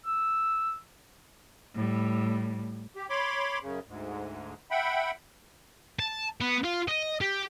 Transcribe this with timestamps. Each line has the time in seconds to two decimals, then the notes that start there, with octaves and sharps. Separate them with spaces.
0.06 E6
1.74 A2 G3
2.96 G4
3.10 C#5 B5 C6 D6
3.62 F#2 C#3
3.88 D2 G#2
4.71 E5 F#5 G5 B5
5.99 A5
6.41 B3
6.64 F4
6.88 D#5
7.21 G4